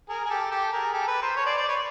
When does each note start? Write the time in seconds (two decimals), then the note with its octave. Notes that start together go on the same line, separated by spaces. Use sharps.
0.09 G#4 A#4
0.26 G#4
0.30 G4 A4
0.51 G4 A4
0.72 G#4 A#4
0.93 G4 A4
1.08 A4 B4
1.22 A#4 C5
1.36 B4 C#5
1.46 C5 D5
1.58 C5 D5
1.68 B4 C#5